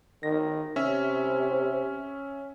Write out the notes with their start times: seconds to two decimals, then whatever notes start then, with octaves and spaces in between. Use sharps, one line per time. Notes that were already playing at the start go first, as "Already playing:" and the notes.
0.23 D#3 A#6
0.76 C3 C#4 E5